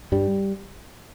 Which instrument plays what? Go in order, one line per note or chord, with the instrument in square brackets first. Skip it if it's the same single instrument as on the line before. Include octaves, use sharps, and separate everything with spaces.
[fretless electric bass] G2 G3